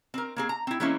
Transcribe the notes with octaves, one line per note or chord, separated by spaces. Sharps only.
C4 A#4
A#3 C4 G#4
A#5
C4 E4
E3 G#3 A#3 C4 C#4 E4